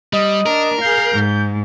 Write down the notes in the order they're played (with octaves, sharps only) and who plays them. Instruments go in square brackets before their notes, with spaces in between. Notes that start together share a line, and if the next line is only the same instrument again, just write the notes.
[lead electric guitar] G3 [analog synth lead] D#5
[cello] D4 [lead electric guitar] A#4
[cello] G#4 F5 [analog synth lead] G6
[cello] G#2